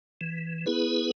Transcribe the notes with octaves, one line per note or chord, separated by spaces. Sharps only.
E3
B3 E4 G#4 B4